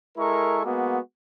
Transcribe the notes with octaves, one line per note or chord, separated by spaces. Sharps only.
G#3 E4 A4 A#4 A#5 C#6
G#3 A#3 B3 F#4